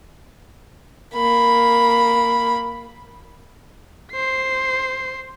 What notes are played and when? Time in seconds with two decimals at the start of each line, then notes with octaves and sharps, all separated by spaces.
1.14 A#3 B5
4.12 C5 C7